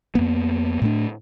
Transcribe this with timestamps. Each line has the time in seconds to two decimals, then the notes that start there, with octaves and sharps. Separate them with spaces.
0.15 F2 A#3 B3
0.82 A2 A3 D4